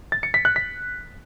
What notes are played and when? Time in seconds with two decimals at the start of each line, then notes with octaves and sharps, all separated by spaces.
0.12 A6
0.23 C#7
0.34 B6
0.45 F#6
0.56 B6